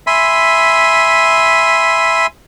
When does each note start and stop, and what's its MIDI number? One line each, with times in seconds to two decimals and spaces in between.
0.07 2.27 76
0.07 2.27 80
0.07 2.27 83
0.07 2.27 84